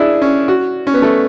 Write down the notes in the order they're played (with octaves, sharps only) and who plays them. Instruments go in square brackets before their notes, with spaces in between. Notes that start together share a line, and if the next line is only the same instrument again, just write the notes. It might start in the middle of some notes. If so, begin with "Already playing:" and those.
Already playing: [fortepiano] D4 E4 G#4
C#4
F#4
C#4
B3
A3